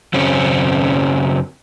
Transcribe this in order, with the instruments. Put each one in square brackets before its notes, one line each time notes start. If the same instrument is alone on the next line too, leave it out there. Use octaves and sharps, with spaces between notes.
[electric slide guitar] F#2 C#3 C4 C#4